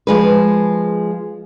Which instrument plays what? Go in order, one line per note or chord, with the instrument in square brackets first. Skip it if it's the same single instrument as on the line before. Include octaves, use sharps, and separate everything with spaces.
[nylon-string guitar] F3 G#3 B4